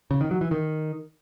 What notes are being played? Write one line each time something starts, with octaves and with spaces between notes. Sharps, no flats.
C#3
D#3
F#3
E3
D#3